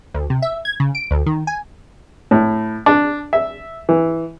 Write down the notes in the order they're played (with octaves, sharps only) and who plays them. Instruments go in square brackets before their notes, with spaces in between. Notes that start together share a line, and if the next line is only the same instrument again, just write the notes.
[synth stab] D2
C3
E5
G#6
C#3
D7
D2
D#3
G#5
[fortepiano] A2
D4
E5
E3